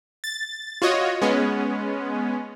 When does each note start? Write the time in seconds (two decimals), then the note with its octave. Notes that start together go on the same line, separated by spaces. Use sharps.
0.24 A6
0.82 F4 F#4 C#5 D#5
1.22 G#3 B3 C#4